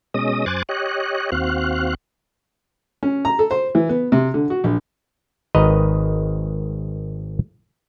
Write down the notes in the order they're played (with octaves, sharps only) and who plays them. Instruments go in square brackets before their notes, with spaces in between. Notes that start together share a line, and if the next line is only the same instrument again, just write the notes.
[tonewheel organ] B2 G#3 C#4 D#5 D#6
F#2 C5 G#5 D6 F#6 A6
G4 C#5 D#5 F#6
D#2 C4 F#4 F5 F#6
[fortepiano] C#4
A#5
A4
C5
E3
B3
C3
D3
F#4
A#1
[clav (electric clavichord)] G#1 D#3 B4 D#5 A#5